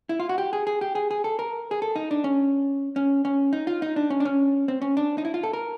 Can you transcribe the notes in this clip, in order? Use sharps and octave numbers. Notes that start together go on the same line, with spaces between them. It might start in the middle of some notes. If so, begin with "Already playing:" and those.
E4
F4
F#4
G4
G#4
G#4
G4
G#4
G#4
A4
A#4
G#4
A4
D#4
D4
C#4
C#4
C#4
D#4
F4
D#4
D4
C#4
D4
C#4
C4
C#4
D4
D#4
E4
F4
A4
A#4